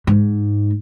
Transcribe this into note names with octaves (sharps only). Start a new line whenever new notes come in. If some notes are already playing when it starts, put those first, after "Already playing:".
G#2